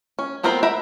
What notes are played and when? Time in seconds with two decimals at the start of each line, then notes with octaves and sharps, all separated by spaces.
0.19 C#4
0.43 A3 B3 C4 A#4 C5
0.63 A#4 E5 F#5 B5